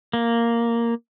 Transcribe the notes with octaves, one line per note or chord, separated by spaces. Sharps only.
A#3